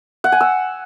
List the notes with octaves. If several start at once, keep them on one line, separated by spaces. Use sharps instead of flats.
F#5
G#5
E6